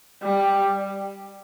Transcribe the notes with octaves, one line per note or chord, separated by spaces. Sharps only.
G3